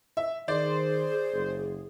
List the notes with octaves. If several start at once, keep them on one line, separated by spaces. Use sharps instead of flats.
E5
D#3 G#4 C5 D5
F#1